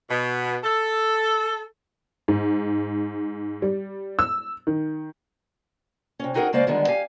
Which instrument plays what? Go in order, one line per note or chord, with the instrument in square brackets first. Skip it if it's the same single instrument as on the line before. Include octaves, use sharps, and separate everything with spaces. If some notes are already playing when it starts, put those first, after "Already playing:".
[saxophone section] B2
A4
[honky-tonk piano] G#2
G3
E6
D#3
[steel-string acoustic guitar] C3 C#4
C4 D#4 F#4 G#4 A#4 F#5
C#3 G#3 A#3 C5 D5 F5
D3 D#3 G3 G#3 B3
G4 F5 G#5